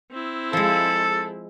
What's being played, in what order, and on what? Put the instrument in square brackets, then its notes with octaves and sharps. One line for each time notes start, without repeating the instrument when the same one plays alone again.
[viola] C4 E4
[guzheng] F3 G#3 [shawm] A4